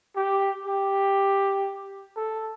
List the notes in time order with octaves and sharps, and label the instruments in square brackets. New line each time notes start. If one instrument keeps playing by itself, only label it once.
[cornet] G4
G4
A4